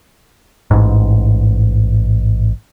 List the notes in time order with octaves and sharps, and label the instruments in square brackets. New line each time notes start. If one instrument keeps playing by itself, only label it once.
[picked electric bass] A1 G#2